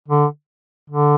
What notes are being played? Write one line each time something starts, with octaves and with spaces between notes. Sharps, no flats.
D3
D3